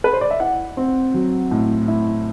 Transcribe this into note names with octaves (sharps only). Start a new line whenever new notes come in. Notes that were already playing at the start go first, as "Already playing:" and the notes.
B4
C5
D5
E5
E4 F#5
C4
F#3
A2
E4